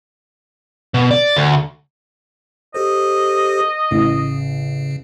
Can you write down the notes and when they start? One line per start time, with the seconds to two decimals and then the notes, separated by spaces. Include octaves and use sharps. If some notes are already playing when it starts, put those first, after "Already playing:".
0.94 B2
1.11 D5
1.37 D2
2.74 G4 A4 C5 D#5
3.91 A1 C#3